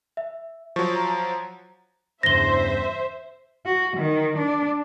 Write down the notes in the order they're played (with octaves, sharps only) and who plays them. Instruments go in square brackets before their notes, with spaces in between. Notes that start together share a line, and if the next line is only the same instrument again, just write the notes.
[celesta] E5
[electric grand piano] F3 F#3 [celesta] C#6
[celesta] A#5
[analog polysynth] E2 G2 C#3 [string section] C5 E5 [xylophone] A#6 G7
[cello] F#4
D#3
D4